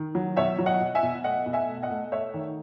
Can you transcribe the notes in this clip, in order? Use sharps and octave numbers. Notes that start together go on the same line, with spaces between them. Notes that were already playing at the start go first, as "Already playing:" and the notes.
Already playing: D#3
F#3
B2 C#5 E5
F#3
D#5 F#5
B2
E5 G#5
B2
A3 D#5 F#5
B2
E5 G#5
A3
D#5 F#5
A3
A3 C#5 E5
D#3